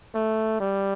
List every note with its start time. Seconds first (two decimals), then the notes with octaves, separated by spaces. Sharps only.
0.15 A3
0.60 G3